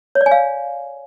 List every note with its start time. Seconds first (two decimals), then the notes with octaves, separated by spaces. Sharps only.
0.15 C#5
0.21 D5
0.26 G#5
0.32 F5